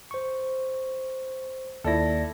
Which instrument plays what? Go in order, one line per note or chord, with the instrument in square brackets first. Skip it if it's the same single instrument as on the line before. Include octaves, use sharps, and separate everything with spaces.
[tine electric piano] C5 C#6
[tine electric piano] D#2 D5 A#6 [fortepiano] E4 A4